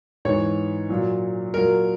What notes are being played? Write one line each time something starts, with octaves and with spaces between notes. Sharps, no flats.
G#2 E3 C#5
A#2 F#3
A#2 F#3 A#4